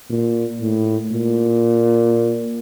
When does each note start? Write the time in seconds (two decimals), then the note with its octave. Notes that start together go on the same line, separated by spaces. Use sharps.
0.10 A#2
0.61 A2
1.12 A#2